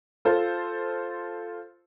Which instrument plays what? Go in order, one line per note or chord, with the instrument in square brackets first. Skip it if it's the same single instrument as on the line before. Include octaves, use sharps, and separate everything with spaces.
[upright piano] F4 A4 C5